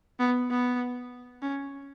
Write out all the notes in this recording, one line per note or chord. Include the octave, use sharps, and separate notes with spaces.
B3
B3
C#4